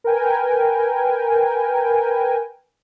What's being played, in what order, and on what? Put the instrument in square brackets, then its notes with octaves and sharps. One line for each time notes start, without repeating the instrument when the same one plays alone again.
[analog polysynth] A#4 B4 G5 G#5